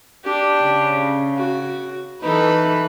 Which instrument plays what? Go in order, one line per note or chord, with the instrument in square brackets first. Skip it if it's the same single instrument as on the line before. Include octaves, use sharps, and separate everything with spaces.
[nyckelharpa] D4 G4
[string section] C#3
[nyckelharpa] F#4
[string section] E3 B4 [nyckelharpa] D#4 A4